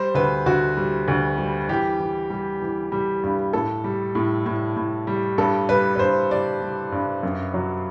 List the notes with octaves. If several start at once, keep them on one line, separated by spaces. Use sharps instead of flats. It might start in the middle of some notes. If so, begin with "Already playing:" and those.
Already playing: G3 C5
D2 B4
D2 F#4
G3
D2
G3
E3 G4
E3
G3
E3
G3
G2
A2 A4
G3
A2
A2
A2
G3
G2 A4
G3 B4
B4
G2 C5
G3 D5
G3
G2
F#2
F#3